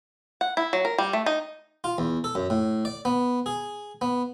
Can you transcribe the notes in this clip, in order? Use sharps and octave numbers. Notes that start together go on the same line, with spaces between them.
F#5
E4
F#3
A#4
G3
A3
D#4
F4
E2
A4
F#2
A2
D5
B3
G#4
B3